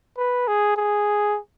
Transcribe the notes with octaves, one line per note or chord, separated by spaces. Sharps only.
B4
G#4
G#4